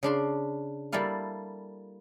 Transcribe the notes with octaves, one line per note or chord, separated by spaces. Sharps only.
C#3 D4 C6
G3 A#3 E4 A4 F5